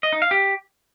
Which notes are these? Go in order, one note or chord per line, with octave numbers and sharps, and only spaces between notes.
D#5
D#4
F5
G4